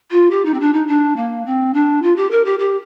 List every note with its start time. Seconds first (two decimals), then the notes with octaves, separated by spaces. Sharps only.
0.11 F4
0.31 G4
0.45 D#4
0.54 C4
0.60 D4
0.73 D#4
0.87 D4
1.16 A#3
1.46 C4
1.74 D4
2.02 F4
2.16 G4
2.31 A#4
2.45 G4
2.59 G4